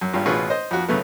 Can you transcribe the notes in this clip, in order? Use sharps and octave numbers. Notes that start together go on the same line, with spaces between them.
F#2
G#1 G2 F4 G4
A1 B2 F4 G#4 B4 C#6
C5 D#5
F2 F#4
F#2 C#3 A3 B3